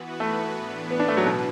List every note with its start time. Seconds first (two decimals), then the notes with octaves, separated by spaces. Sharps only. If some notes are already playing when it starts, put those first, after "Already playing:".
Already playing: E3 B3 F#4 B4
0.20 A3
0.55 A2 E3 B3 D4 B4
0.91 B3
1.00 D4
1.08 A3
1.17 F#3
1.26 B2